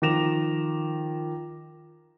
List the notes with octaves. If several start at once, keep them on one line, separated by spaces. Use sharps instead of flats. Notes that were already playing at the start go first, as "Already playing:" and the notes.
D#3 F3 D6 A#6 E7 F7